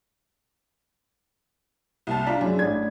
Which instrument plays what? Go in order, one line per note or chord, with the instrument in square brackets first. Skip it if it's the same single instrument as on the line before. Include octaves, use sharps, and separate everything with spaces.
[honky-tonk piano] C2 A5 [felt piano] A#3
[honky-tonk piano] D4 F4 [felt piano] A#5 B6
[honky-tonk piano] F#2 [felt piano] G#3 D4 E4
[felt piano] A1 D4 [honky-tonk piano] G#6